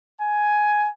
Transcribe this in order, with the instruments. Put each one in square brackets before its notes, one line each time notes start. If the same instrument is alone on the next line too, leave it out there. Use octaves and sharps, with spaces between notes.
[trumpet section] G#5